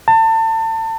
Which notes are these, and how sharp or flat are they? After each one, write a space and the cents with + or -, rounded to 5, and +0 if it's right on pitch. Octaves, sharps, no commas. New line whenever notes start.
A5 +30